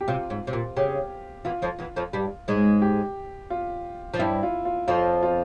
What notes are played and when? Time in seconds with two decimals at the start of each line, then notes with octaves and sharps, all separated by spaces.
0.01 G4
0.08 C3 F4
0.30 G#2
0.47 C3
0.53 A#2
0.77 C#3 G4
1.45 E2 E3 F4
1.62 F2 F3
1.79 E2 E3
1.96 F2 F3
2.13 G2 G3
2.48 G#2 G#3
2.82 G4
3.50 F4
4.14 F3
4.19 G2 G3 E4
4.43 F4
4.65 F4
4.88 F2 F3 F4
5.23 F4